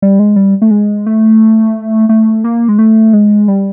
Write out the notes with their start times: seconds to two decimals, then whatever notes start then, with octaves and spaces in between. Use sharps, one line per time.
0.02 G3
0.19 G#3
0.36 G3
0.62 A3
0.71 G#3
1.06 A3
2.09 A3
2.44 A#3
2.69 G#3
2.79 A3
3.13 G#3
3.48 G3